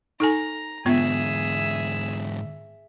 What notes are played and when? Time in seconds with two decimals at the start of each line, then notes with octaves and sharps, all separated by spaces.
0.20 D#4 A4 G#5 A#5
0.86 G#2 D3 B3 F4 G#4 E5